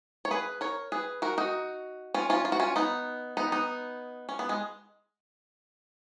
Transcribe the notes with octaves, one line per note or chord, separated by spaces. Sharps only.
C#5
G#4 B4
A#4 C#5
G#4 B4
F#4 A#4
D#4 F#4
C#4 F4
C#4 F4
F4
F#4
C#4 F4
B3 D#4
B3 D#4
B3 D#4
C#4
B3
G#3